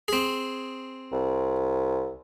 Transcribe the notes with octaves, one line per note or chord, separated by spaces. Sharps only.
C4 G#4
C2